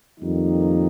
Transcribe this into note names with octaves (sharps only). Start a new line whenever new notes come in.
F2 D#3 G3 A#3 D#4